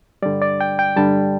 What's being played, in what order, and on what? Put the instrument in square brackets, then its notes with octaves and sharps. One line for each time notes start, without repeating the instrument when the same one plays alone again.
[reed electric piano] G2 D3 G3 D5
D5
G5
G5
G2 D3 G3 A5